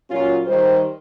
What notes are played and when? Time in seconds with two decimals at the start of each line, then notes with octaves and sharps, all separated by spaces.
0.10 A#2 F#3 C#4 F4
0.47 D#3 G3 G4 C5